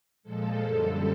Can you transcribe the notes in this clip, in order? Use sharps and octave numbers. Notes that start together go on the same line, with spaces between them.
A#2 F3 G#3 A4
F#2 D3 G3